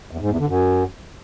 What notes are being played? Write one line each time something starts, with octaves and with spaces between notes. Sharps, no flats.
E2
G#2
E2
D3
F#2